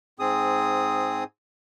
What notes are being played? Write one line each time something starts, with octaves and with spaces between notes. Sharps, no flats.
G#2 C4 G#4 D#6